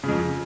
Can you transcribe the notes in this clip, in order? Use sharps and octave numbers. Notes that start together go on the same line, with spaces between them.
F2 C#3 F3